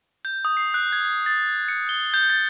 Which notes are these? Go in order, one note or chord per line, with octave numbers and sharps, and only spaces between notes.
G6
D#6
C7
F#6
G#6
A6
C#7
G7
G6
A6